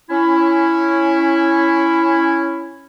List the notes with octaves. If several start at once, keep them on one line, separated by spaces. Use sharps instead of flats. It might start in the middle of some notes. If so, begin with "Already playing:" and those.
C#4 E4